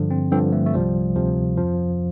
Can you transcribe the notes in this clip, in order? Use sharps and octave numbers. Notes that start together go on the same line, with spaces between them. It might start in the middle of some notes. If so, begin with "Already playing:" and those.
Already playing: G2 D3 F3
C4
G2 D3 F3 C4
A3
A3
C2 C3 F3 G3
D2 C3 F3
F2 F3